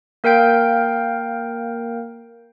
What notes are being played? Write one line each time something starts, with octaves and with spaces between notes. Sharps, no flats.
A#3 A#4 F5 G5 G6 D7